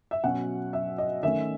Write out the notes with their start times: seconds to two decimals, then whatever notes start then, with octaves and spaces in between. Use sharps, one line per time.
0.11 E5
0.24 B2 F#3 C#4 F#5
0.73 E5
0.98 D#5
1.23 D#3 A3 C#4 E5